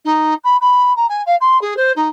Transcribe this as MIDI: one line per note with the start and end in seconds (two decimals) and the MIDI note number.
0.05 0.34 63
0.44 0.56 83
0.61 0.95 83
0.96 1.06 82
1.09 1.22 80
1.26 1.35 77
1.41 1.60 84
1.61 1.76 68
1.77 1.92 72
1.96 2.08 63